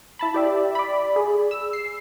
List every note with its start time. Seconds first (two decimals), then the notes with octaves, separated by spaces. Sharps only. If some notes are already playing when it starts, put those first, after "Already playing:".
0.19 E4 A5 B5
0.34 G4 D5 E5
0.75 D5 B5
1.16 G#4
1.51 E6
1.73 C7